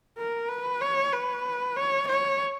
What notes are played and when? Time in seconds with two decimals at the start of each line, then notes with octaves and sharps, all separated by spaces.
0.18 A#4
0.49 B4
0.81 C#5
1.13 B4
1.77 C#5
2.08 C#5